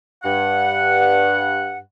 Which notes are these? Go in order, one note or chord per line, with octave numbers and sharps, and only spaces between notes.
G2 F#5